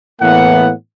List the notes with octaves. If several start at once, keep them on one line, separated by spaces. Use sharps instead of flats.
A2 E3 A#3 B3 F#5